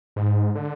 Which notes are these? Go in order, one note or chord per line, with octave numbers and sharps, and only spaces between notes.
G#2
D3